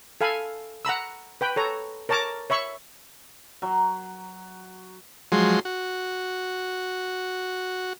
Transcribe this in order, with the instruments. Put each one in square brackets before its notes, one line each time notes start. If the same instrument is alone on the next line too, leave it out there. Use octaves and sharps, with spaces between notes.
[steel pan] A4 F5 G#5 B5
F#5 A#5 B5 E6
B4 G5 B5
A4 C#5 A#5
A#4 C#5 A5 A#5 D6
C#5 E5 B5 C#6
[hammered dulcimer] F#3
[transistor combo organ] F3 F#3 G#3 C6
F#4